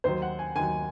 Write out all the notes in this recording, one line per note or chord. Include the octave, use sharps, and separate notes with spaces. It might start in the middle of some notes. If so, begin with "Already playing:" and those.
D#2 D#3 F#3 C5
F#5
G#5
D#2 D#3 F#3 G#5